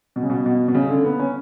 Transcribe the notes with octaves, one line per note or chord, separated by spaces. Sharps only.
B2
C#3
B2
B2
B2
C#3
D3
B3
C#4